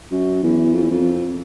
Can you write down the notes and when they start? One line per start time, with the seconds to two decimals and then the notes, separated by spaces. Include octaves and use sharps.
0.12 F#2
0.43 E2
0.74 F2
0.83 E2
0.91 F2